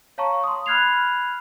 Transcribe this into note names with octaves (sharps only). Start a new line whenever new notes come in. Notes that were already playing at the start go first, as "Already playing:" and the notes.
C#5 F5 A5 A#5 C#6
C6 D#6
B5 F6 F#6 G#6 C7 F7